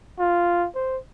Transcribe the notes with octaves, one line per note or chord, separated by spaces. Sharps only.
F4
C5